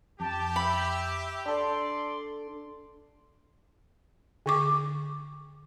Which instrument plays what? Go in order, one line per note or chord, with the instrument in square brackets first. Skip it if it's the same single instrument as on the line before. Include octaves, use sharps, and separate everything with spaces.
[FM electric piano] F2 [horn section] G4 [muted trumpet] A5
[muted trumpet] E5 [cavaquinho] B5
[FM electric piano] D4 A4 [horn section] D5 [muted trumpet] C6
[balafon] D3 C#6 D6